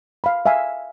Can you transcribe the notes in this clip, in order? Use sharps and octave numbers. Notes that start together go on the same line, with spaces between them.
F5 B5
E5 F5 G#5